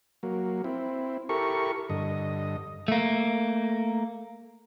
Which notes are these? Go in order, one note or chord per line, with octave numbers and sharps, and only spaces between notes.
F#3 A#3
C4 E4
E4 G4 A4 A#4 C#6
G2 D3 D#5
A3 A#3